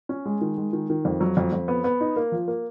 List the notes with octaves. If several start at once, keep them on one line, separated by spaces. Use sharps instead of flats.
C#4
G#3
D#3
G#3
D#3
D#3
F2
F#3
F2
F2
B3
B3
D#4
A#3
F3
A#3